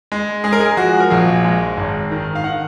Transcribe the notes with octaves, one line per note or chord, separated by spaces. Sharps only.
G#3
G#3 G#4
A#4
G#4
F3 F#4
A#4
A#1 G#4
G#3
G#1
D#3
F5
D#3 F#5